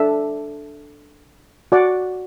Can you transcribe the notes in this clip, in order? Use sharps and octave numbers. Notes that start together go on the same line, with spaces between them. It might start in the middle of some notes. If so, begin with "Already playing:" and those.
Already playing: D4 A4 E5
F#4 D5 F#5